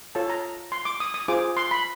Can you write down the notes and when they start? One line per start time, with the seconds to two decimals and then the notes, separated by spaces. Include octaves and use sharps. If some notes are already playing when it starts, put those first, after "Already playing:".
0.15 F4 A4 C#5 A5
0.30 A#5
0.72 C6
0.85 D6
1.00 D#6
1.14 D#6
1.28 F4 G#4 C5 D6
1.57 C6
1.71 B5